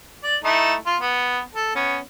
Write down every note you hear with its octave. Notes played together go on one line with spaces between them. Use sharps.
D5
A3 D#4 E4
F4
B3
A4
B3 C#4